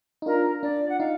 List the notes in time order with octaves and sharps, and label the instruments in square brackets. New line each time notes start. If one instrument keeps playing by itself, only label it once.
[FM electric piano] D#4
[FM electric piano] D4 F4 [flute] A#4
[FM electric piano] D4 [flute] D5
[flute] F#5
[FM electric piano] D#4 [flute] F5